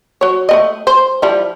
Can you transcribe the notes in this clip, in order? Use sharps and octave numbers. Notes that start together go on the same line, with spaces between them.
F#3 C#5
A3 C4 D#5
C5
F3 G3 E4